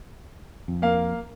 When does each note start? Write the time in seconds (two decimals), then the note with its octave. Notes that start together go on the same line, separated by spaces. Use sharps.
0.68 F2
0.82 A#3 F5